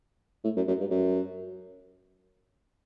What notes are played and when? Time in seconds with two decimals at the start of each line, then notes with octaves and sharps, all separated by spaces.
0.44 A2
0.56 F#2
0.68 F#2
0.80 G2
0.91 F#2